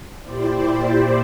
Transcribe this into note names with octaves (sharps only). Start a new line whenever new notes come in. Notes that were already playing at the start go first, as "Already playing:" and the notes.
A#2 E4 G4 C5 D5